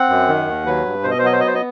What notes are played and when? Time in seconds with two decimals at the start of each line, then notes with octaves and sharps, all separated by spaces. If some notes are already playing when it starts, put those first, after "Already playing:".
Already playing: C4 F#5
0.09 F#2
0.28 D#3
0.47 D#2
0.66 F#3 B4
0.85 G2
1.03 B2 C5
1.11 D#5
1.19 C5
1.23 F#3 D#5
1.33 C5
1.40 B3 D#5
1.47 C5
1.55 D#5